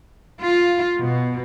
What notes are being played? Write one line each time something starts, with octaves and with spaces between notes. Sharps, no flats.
F4
B2